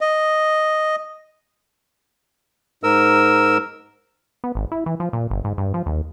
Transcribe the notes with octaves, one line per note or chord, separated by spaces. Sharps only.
D#5
G#2 A#4 E6
B3
G#1
E4
E3
F3
A#2
G1
G#2
G2
F3
D#2